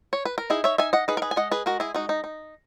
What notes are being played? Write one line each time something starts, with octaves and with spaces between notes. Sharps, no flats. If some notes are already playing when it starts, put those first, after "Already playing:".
C#5
B4
A#4
D#4 E4 G#4
C#5 E5
D#4 E5 G#5
D#5 F#5
D#4 G#4 B4
A#4
G#4 B4
G#5
G#3 D#5 F#5
G#4 B4
G#3 F#4 A#4
E4 G#4
G#3 D#4 F#4
D#4
D#4